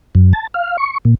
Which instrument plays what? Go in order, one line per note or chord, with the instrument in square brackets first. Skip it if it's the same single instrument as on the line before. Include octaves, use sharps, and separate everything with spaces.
[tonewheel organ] F#2
A5
F5
C#6
A#2